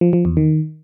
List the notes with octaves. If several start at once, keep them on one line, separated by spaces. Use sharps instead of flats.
F3
F3
E2
D#3